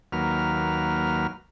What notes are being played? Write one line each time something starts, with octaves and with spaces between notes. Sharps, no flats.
D#2 F#3 A#3 B4 F6